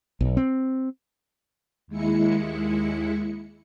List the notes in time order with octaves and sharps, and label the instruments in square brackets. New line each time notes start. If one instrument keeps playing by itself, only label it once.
[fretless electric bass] B1
C4
[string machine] D#2 G#3 E4 C#7